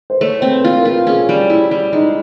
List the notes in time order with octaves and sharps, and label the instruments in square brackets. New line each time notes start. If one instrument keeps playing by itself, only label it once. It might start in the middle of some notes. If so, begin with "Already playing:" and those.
[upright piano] C5
[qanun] A3 [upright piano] C#5
[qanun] C4 [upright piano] C5
[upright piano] B4
[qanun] F4
[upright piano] A#4
[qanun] F4
[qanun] C#4 [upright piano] G#4
[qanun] G3
E4
G3
[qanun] G#3 [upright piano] D#4